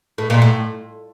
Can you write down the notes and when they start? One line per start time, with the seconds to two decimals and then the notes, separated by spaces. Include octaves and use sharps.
0.18 A2
0.30 A#2
0.42 A2